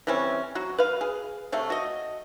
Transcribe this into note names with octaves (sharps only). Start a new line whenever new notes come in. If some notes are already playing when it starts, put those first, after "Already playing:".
E3 G3 C4 C#4
F#3 F#4
B4 F5
G#4
C3 A3 C#5 F5
F#4 D#5